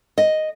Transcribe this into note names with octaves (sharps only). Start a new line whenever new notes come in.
D#5